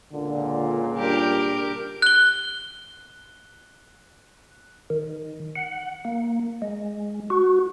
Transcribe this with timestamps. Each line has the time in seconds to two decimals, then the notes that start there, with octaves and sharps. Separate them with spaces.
0.13 C#2 A#2 D3
0.97 G3 D4 G4 A#4
2.02 F#6 G7
4.90 D#3
5.56 F#5
6.05 A#3
6.62 G#3
7.30 F#4